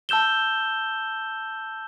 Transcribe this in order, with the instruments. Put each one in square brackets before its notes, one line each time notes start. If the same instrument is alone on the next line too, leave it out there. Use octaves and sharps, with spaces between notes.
[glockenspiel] A5 E6 G6 E7 G7